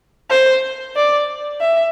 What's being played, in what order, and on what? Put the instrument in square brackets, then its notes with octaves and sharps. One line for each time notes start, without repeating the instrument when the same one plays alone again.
[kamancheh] C5
D5
E5